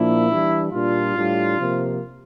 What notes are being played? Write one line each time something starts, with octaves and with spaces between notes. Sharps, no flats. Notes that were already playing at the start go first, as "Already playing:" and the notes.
Already playing: A#2 F3 A#3 D4 E4
E3 G3 D4
A#2 G3 D4 F4
A2 G3 D4
C3 F3 A#3